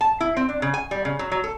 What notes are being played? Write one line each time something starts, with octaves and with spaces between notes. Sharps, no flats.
A5
E4
C4
D4
C#3
G#5
G3
C#3
F#3
F#3
A4